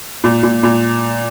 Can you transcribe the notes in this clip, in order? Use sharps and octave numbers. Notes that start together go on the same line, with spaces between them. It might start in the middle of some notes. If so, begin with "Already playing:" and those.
A#2
A#2
A#2